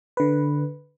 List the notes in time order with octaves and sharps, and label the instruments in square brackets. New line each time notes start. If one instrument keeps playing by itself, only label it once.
[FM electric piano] D3 B4